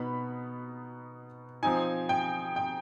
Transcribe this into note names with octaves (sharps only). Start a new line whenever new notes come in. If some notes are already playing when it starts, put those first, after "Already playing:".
Already playing: B2 B3 D#4 B5
F3 C4 D#4 G#5
G5
G5